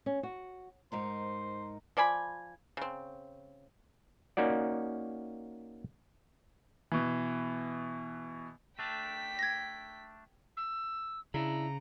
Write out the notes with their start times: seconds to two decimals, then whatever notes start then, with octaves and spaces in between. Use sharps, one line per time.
0.06 C#4
0.23 F#4
0.92 G#2 D#4 A#4 C5
1.97 F3 D5 G#5 B5
2.77 C#3 C4
4.37 A#3 C#4 D#4 F#4 D5
6.92 B2 E3
8.79 A3 D4 G5 B6
9.39 G#6 A#6
10.57 E6
11.34 C#3 D4 E4 A#5